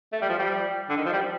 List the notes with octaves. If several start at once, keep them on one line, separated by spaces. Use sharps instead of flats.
A3
G3
F3
G3
D3
D#3
F3
G3